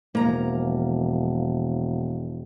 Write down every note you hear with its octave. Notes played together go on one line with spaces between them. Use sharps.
E1 F3 A#3 A#5